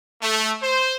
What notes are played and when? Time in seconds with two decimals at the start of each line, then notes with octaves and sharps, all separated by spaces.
0.22 A3
0.63 C5